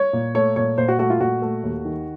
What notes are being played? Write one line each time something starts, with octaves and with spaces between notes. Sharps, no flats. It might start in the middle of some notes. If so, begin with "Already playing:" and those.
Already playing: C#5
A#2
A3 C#5
A#2 C#5
A#2 C5
F#4
A3 F#4
F4
A#2 F#4
A3
D#2
D#3